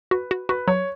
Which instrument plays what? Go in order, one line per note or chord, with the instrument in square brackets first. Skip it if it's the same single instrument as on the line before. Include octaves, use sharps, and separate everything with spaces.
[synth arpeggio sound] F#4 [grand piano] B4
[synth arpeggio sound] F#4
[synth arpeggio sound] F#4 [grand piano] B4
[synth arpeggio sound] F#3 [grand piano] C#5